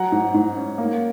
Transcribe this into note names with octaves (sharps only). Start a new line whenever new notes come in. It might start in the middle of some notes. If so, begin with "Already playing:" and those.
Already playing: F#3 F#5 A#5
G#2
G#2
C#4
A#3